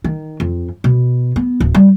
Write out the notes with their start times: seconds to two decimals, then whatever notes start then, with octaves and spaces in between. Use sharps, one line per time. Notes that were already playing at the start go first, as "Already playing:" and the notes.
0.04 D#3
0.40 F2
0.84 B2
1.36 B3
1.60 D1
1.75 G3